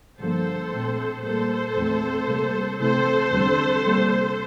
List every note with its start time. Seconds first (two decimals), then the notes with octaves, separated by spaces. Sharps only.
0.19 G2 D3 F3 A#3 A4 C5
0.71 A#2 A3 C4
1.23 A#2 G3 A#3 A4 C5
1.75 E2 E3 A3 C4
2.27 C3 G3 A#3
2.79 C3 E3 A3 C4 A4 C5
3.31 E2 D3 G3 C4
3.83 C3 G3 A#3